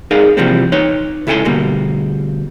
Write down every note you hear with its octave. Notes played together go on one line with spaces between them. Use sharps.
D#4 G#4 A#4 D5 F5
C3 E3 F3 G3 A#3 C4
D#4 B4 C#5 C6
C#2 E4 A4 F#5 G#5 C6
D2 B2 G3 A#3